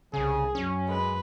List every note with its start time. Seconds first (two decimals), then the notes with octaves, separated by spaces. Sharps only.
0.13 C2 C#3 G#4
0.55 F#2 C#4
0.88 G#3 B4